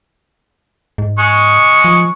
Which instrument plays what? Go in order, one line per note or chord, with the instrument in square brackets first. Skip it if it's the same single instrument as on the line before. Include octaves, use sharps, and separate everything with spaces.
[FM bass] G#2
[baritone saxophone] G#3 [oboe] C#6
[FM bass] F3